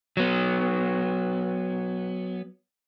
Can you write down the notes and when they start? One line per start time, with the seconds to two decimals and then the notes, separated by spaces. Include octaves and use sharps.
0.17 F#3 B3